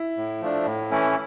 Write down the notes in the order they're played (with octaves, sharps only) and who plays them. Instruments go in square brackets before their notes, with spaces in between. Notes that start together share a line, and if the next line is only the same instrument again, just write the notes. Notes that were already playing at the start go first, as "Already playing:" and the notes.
Already playing: [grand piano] E4
[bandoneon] A2
F3 A3 D4
A2
E3 A3 C#4 E4